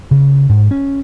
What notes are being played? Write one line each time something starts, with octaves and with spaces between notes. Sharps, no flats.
C#3
G#2
C#4